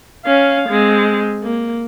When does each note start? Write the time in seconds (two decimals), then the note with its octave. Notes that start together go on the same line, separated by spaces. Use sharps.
0.25 C#4 F5
0.70 G#3 C4
1.43 A#3